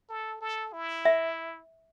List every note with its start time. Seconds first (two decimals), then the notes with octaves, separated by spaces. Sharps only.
0.09 A4
0.41 A4
0.73 E4
1.05 E5